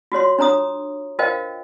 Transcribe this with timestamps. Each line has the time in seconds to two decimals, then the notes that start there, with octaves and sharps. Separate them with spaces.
0.12 F4 F#4 C#5 C6
0.39 D4 C#5 A#5 D#6
1.19 F4 A#4 C5 D#5 F5 G5